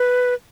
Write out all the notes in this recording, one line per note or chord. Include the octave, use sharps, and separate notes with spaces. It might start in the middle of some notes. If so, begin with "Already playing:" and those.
Already playing: B4